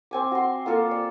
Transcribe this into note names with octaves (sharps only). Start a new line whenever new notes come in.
C4 G#5 D6
F#4 C6
A#3 F4 A4 F5
D5